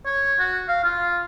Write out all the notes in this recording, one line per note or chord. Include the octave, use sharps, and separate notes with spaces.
C#5
F#4
F5
F4